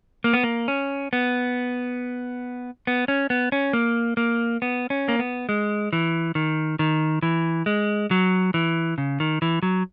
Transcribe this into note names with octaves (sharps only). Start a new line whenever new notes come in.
A#3
B3
A#3
C#4
B3
B3
C#4
B3
C#4
A#3
A#3
B3
C#4
A#3
B3
G#3
E3
D#3
D#3
E3
G#3
F#3
E3
C#3
D#3
E3
F#3